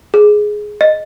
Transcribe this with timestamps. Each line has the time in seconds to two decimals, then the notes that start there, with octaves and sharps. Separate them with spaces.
0.14 G#4
0.81 D#5